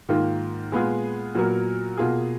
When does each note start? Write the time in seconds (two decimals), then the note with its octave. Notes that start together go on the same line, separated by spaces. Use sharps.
0.09 G#2 D#3 A#3 F4
0.72 A#2 G#3 B3 F4 G#4
1.35 A#2 F#3 B3 F#4 A#4
1.97 B2 A#3 F4 G#4